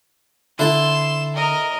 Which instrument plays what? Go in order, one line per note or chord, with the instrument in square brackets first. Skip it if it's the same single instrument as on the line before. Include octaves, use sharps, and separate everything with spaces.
[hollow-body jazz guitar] D3 [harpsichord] E4 A4 A5 [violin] C6 E7
[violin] A#4 D#5